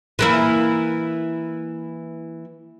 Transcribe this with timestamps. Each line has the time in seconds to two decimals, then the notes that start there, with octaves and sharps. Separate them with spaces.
0.19 E3 A#3 E4